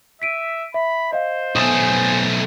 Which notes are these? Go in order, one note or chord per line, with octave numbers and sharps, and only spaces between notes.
E5 B6 D7 D#7
E5 B5
C5 D#5 F5
B1 A3 B3 G#5 D#6 E7